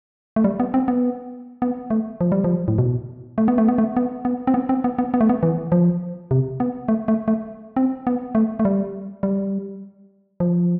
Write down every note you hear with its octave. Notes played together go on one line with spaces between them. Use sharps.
A3
G3
B3
C4
B3
B3
A3
F3
G3
F3
A2
B2
A3
B3
A3
B3
A3
B3
B3
C4
B3
C4
B3
B3
B3
A3
B3
E3
F3
C3
B3
A3
A3
A3
C4
B3
A3
A3
G3
G3
F3